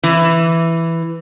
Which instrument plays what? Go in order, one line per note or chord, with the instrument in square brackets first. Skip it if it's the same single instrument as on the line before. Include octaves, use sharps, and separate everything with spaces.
[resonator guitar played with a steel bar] E3